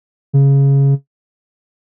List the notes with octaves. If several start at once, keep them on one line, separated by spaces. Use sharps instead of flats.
C#3